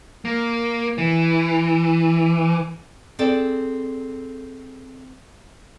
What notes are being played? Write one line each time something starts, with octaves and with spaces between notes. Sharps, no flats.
A#3
E3
C4 G#4 A4 D5